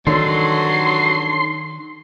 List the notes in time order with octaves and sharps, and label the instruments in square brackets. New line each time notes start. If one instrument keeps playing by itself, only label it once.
[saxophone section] G2 F#3 [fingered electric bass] D#3 [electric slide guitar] D4 D#4 A4 [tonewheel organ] C6